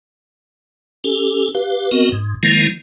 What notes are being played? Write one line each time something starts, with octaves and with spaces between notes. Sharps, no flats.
C#4 G4 A4
G4 B4 F5
B3 C4 F#4 A#4 D#5
G#2
D#3 F3 G#3 A#3 E4